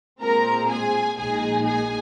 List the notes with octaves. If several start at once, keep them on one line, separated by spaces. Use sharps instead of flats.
A#2 G#3 C4 F4 A#4 A#5
G#4 G#5
A#1 A#2 G#3 D#4 G#4 G#5
G#4 G#5